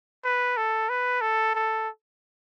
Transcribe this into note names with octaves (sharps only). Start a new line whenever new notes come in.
B4
A4
B4
A4
A4